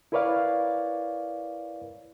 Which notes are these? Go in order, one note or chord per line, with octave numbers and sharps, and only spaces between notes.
E4 A#4 B4 C#5 D5 F5